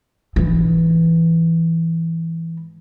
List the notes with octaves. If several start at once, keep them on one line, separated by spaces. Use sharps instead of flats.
G#2 E3